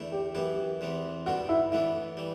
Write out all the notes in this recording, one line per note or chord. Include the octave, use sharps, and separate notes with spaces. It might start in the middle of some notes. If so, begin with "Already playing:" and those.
Already playing: E2 D3 A3 E4
G4
F#2 E3 B3 E4 G4
E2 C3 E3 B3
D3 G3 B3 D4 F#4
E4
A2 E3 B3 D4 E4
E3 G3